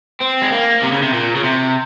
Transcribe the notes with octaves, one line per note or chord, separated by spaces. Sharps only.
C4
G#3
A#3
C3
C#3
C3
A#2
C#3
C3